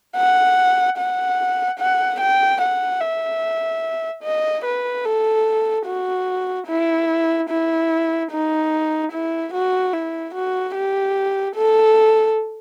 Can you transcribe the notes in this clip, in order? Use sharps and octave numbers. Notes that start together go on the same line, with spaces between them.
F#5
F#5
F#5
G5
F#5
E5
D#5
B4
A4
F#4
E4
E4
D#4
E4
F#4
E4
F#4
G4
A4